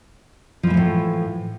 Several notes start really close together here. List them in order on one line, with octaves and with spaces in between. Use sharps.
F3 E3 A#3 A3 A2